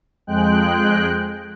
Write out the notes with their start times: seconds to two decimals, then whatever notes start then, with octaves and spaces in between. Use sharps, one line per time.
0.27 F2 G#3 G5 F#6